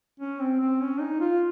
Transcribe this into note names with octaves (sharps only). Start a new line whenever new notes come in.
C#4
C4
C4
C#4
D#4
F4